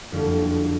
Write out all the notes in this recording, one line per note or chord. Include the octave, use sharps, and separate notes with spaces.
F#1 F2 D3 G3